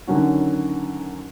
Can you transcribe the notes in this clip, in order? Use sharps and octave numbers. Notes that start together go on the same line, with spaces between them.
D3 D#3 F#3 C#4 F#4